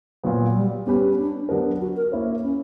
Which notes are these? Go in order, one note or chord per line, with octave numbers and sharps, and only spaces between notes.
A#2 F#3 B3
G3
G3 B3 C#4 G4 B4
D4
F#3 B3 D4 G4 A#4
F#4
A#4
A#3 E4 A#4 C#5
C#4